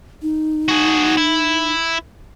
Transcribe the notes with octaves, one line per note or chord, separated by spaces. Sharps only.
D#4
F#4 G#4
E4